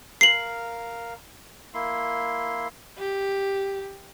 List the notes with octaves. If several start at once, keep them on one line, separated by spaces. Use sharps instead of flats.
A#4 F5 C7 F#7
A#3 E4 C6
G4